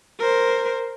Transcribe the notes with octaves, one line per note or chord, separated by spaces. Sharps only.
A#4 C5